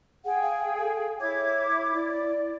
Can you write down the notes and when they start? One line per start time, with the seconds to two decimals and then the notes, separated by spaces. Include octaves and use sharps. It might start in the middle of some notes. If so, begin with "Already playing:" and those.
0.25 G#4 F#5 G5
0.42 F5
0.77 A4
1.20 E4 C#5 D6 G#6
1.93 E4 D5